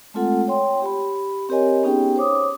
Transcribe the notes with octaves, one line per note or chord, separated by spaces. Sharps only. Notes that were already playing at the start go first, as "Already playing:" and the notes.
G#3 A3 C4 F4 A4 F#5
C#5 G5 C6
G4 B5
C4 G4 A#4 C#5 D#5 G#5
B3 C#4 D#4 G4 G#4 G5
C5 C#5 D6 D#6